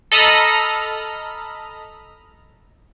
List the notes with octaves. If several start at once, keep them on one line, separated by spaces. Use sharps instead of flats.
A4 D#5 A#5 B5 F6